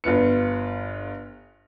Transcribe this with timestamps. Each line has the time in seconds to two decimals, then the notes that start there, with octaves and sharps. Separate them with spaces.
0.04 G1 F4 B4 C#7